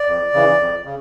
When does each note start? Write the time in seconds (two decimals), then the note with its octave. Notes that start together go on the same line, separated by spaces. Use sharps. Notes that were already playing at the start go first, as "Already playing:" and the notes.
Already playing: D5
0.08 F2
0.34 C#3 E3
0.60 F2
0.85 C#3